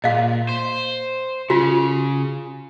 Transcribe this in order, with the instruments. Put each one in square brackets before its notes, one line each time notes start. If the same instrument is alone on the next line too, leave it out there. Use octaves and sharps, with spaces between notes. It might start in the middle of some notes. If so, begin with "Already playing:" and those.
[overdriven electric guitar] A#2 [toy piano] D#5 F5
[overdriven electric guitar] C5
[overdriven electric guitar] C#3 [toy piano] F4 F#4